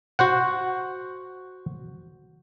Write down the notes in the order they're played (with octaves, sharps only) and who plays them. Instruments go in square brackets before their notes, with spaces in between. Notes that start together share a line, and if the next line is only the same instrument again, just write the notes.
[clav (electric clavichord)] F#4 C5 F#5